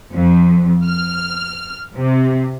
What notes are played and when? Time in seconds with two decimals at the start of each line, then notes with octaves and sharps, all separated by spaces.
0.13 F2
0.87 F6
1.95 C3